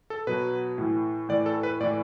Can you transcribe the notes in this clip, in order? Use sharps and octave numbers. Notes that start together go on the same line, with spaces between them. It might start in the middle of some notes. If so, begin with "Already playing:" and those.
A4
B2 F#3 B4
A2 E3
A2 E3 D5
A4
B4
A2 E3 D5